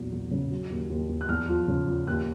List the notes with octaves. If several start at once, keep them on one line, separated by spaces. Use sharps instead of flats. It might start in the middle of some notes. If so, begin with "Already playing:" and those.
Already playing: A#1 E2 F#3
E2
C#3
F#3
D#2
D#2
D#2
F#6
E2 F6
F3
C#3
F3
D#2 F#6